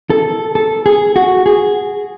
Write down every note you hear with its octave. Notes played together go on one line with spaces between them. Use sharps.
A4
A4
G#4
F#4
G#4